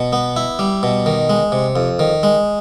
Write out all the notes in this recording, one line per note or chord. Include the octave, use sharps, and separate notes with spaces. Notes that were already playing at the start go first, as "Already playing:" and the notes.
Already playing: B2
B3
E4
G3
B2
D#3
G#3
C3
F2
D#3
G#3